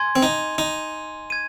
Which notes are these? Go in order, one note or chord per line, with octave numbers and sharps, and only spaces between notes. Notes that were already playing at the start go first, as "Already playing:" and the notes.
Already playing: G#5 C6 G#6
C4
D#4
D#4
G#6 D#7